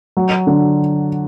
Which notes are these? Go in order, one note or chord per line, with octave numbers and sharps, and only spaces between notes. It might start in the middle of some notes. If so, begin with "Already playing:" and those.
F#3
D3